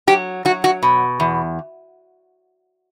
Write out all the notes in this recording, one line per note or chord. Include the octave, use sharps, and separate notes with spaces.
F#3 G4
F#3 F#4
F#4
B2
E2